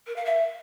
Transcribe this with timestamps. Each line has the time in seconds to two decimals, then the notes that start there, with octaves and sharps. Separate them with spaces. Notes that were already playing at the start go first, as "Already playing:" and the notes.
0.06 A#4
0.16 F5
0.25 E5